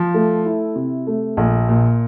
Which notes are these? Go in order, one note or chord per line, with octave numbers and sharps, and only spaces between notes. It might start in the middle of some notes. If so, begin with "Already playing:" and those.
Already playing: F3
A3
E4
C3
A3
A#1
A#2